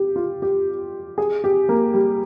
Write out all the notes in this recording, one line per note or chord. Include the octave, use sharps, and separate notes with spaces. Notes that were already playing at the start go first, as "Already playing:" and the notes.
Already playing: G4
F4
G4
G#4
G4
A#3
G3